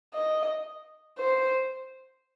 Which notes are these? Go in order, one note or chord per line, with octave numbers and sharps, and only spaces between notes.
D#5
C5